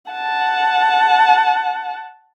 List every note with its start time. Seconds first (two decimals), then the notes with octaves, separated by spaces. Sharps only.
0.11 F#5 A5